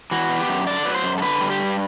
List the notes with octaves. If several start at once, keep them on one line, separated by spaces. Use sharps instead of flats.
E3 F#4
B3
G4
F#2
D3 D5
A4
F#3 B4
C5
F#2
A4
D3 B4
G3
G4
G2